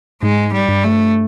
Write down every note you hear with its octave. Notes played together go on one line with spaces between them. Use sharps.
G#2 G#3
G3
G2
A3